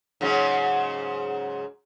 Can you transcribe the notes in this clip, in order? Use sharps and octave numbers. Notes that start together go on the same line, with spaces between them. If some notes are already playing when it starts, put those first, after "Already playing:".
G#2 C#3 F#3